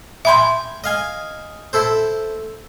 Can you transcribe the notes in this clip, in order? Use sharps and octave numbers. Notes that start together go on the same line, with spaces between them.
E5 G5 G#5 B5 C6 D6
D#5 F5 G#5
E4 A4 C5